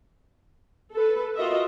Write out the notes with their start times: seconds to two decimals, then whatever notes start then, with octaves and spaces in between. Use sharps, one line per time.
0.93 A4 B4
1.35 F4 F#4 A#4 D#5 E5